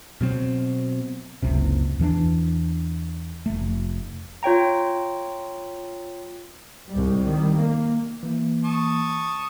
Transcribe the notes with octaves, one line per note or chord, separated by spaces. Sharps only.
B2 F#3 C4
F#1 C#2 C3
E2 E3 C#4 D4
F1 A3
F4 C#5 G5 A#5
C2 G#2 G3
D#3 G3
A#3
E3 A#3
A5 C#6 D#6